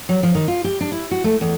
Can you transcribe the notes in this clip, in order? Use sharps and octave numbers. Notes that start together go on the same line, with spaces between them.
F#3
F3
D#3
F4
G4
D4
E4
F#4
A3
E2